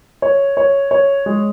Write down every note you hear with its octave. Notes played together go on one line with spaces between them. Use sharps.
C#5
C#5
C#5
G#3